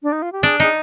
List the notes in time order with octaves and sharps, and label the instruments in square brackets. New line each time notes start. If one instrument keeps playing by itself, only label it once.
[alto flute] D4
D#4
F4
G4
[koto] D4 [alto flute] G#4
[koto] D#4 [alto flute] G#4